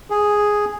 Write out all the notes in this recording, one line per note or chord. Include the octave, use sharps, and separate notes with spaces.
G#4